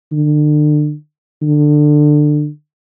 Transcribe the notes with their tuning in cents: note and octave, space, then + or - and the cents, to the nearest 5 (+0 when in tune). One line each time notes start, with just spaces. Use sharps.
D3 +35
D3 +20